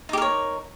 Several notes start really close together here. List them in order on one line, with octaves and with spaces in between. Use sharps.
D#4 G4 A#4 C#5